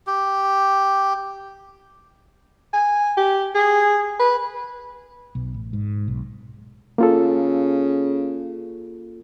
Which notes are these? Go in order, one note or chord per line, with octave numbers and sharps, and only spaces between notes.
G4
G#5
G4
G#4
B4
B1
A1
G#2
B1
C#3 A#3 F4 A4